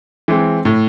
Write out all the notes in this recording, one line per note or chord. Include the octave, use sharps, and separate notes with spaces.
E3 G#3 C4
A2